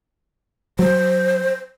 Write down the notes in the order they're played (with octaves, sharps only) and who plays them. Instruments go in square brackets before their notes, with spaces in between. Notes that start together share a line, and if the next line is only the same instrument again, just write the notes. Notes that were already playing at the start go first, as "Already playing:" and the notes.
[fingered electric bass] F#3 [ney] C5